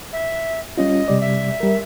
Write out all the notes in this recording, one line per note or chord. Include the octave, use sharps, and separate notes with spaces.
E5
G3 C#4 F4 D#5
C3 G3 D5
E5
G3 A#4